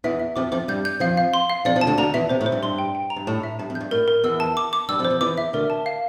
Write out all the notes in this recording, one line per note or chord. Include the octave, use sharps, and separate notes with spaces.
E2 E3 E5
E5
F2 F3 D6
F2 F3 D6
G2 G3 G6
G6
F2 F3 F5
F5
C6
F5
F2 F3 D5
F2 F3
A5
D2 D3
D2 D3 A#5
E2 E3 E5
C3 C5
A2
C5
G2
G2 C6
G5
G5
A#5
G2
A2 A5
E5
G2 A5
F2
G6
G2
A2 A#4
A#4
E2 E3 E6
A5
D6
D6
G2 G3 E6
F2 F3
C5
F2 F3
E2 E3 D6
E5
D2 D3 A#4
A5
F5